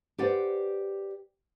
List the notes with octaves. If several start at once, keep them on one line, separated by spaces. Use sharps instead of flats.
G4 B4 C5 D5 F#5